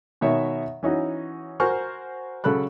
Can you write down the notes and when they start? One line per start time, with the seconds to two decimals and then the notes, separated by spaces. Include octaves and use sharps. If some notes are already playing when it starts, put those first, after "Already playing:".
0.21 B2 D#3 C#5 E5
0.83 E3 C#4 D#4 F#4
1.60 F#4 A#4 C5 G#5 C#6 F6
2.44 C#3 F#3 A4 B5 F#6